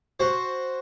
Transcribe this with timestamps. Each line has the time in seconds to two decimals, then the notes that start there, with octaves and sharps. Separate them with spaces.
0.20 F#4 C5